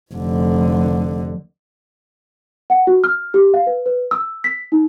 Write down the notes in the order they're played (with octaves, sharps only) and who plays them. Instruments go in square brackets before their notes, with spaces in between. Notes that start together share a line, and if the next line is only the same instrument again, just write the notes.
[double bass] F1 D3
[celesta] F#5
F#4
F6
G4
F5
B4
B4
E6
B6
D#4